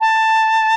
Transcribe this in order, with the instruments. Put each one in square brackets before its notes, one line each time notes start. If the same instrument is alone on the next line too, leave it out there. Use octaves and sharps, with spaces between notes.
[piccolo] A5